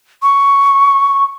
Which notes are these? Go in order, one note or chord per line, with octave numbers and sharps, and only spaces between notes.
C#6